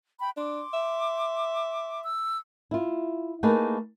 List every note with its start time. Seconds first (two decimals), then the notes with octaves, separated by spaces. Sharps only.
0.20 G5 B5
0.37 D4 C6 D6
0.73 E5
2.03 E6
2.71 E4 F4
3.43 A3 A#3 D#4 G#4 B4